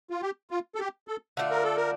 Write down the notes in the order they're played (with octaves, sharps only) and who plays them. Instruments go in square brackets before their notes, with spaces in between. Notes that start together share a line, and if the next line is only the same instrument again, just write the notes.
[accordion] F4
G4
F4
A4
G4
A4
[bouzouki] D3 A3 D4 F4
[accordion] A#4
A4
A#4